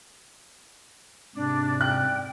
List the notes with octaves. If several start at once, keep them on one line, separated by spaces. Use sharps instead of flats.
G#2 C3 D4 D5
G5 F#6